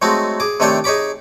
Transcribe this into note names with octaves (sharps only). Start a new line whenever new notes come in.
F#3 G#3 A3 C4 D#4 F#4
G#4 D6
C3 D#3 A3 D4 C#5 G5
D#4 G#4 C#5 B5 D6